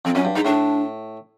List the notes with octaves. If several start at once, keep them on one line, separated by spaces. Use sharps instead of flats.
F2 C4
F#2 C#4
G2
G#2 D#4
A2 D4